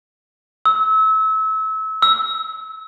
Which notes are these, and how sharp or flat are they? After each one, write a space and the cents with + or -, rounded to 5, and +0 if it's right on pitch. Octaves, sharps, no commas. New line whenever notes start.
E6 -30
E6 +5